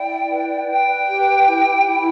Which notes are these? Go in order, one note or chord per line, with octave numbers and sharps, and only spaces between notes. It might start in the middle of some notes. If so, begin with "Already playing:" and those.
Already playing: E4 D5 G5
B4
B4 G5
G4
E4
E4